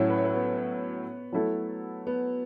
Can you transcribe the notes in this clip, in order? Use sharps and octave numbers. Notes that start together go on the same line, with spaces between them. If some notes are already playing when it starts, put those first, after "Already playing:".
Already playing: A2 F#3 C#4 E4 C#5
B4
C#5
B4
B3
F#3 A3 E4 A4
B3